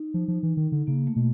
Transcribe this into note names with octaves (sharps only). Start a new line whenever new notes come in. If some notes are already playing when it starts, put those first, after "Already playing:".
Already playing: D#4
F3
F3
E3
D#3
D3
C#3 A#3
A3
B2